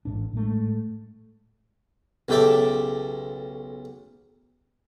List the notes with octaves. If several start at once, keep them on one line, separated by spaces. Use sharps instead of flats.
A1 G#2 D4
A2 G#3 A3
B1 C#3 G4 A4 E5 D6